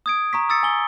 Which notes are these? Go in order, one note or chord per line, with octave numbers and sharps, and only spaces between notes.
D#6 G#6 D7
A#5 C#6 B6
D#6 E6 A6 C#7
G#5 G7